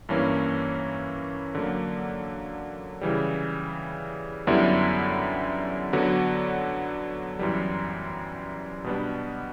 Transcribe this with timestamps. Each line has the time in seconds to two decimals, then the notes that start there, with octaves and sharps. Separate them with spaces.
0.09 G2 E3 A#3 C#4
1.55 D3 F#3 A#3
3.01 C#3 E3 G3
4.47 F#2 D3 G3 B3 E4
5.93 D3 F#3 B3 F#4
7.39 F#2 E3 G3
8.84 B2 G3 B3 D4